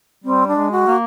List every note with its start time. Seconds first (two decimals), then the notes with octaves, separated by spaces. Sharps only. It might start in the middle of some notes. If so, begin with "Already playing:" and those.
0.24 G3 C4
0.47 D4
0.55 G#3
0.72 F#4
0.87 A#3